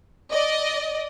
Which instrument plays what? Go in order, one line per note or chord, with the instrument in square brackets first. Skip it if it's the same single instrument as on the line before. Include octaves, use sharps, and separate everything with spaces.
[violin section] D5 D#5